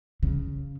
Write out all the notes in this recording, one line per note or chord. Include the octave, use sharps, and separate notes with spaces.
C#3